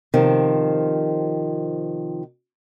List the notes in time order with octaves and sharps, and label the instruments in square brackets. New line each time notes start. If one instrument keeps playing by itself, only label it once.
[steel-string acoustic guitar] C3 D#3 F3